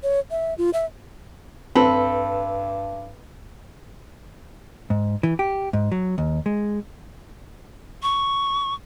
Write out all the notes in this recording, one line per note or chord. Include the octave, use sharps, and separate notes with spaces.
C#5
E5
F4
E5
G2 C4 A4 B4
G#2
E3
G4
G#2
F#3
D#2
G#3
C#6